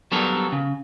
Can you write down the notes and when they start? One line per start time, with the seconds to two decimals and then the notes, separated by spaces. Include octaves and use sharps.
0.12 F#3 G3 B3 D4 A4 A#4
0.52 C#3